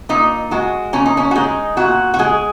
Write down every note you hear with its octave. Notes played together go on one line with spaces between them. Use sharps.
A#2 D#4
G#3 F#4
A#2 C#4
D#4
C#4
F#4
G#3 D#4
A#2 F#4
F#4
G#3 G#4